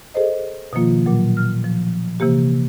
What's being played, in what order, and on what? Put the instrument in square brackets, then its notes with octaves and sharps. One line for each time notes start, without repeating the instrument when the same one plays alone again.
[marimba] G#4 A4 C5 D#5
B2 D#3 F3 A#3 F4
A#2 F#3
F6
F3
C3 E3 A#3 G4